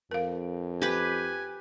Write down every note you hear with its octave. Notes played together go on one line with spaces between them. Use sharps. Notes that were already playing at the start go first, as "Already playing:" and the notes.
F2 A#4 F5
G4 B4 G#5